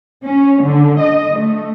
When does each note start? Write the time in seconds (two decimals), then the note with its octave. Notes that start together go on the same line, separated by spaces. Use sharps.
0.23 C#4
0.62 D3
1.00 D#5
1.39 A3